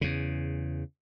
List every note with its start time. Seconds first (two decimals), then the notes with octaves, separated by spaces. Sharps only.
0.01 E2 C#3